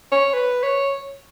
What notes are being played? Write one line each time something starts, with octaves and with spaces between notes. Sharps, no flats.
C#5
B4
C#5